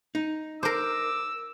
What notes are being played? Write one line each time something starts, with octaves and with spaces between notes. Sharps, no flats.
D#4
A#4 C5 D6 E6